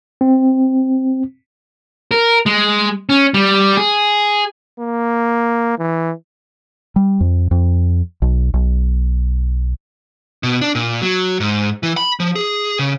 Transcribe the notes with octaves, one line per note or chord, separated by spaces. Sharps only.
C4
A#4
G#3
C#4
G3
G#4
A#3
E3
G3
F2
F2
B1
B1
B2
D4
A#2
F#3
G#2
E3
B5
F3
G#4
C#3